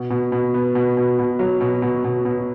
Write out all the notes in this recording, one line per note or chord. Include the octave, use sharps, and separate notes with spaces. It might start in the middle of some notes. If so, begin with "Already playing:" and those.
Already playing: B2
B2
B2
B3
B2
B2
B2
F#3
B2
B2
B2
B2